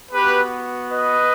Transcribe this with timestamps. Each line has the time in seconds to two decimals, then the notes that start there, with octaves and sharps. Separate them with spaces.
0.12 B3 F#4 G4 B4
0.91 B4 D#5